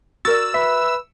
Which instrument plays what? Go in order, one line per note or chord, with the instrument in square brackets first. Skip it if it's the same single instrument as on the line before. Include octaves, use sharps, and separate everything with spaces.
[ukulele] F#4 A#4 D5 [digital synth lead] E6 [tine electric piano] A6
[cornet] B4 [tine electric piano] E5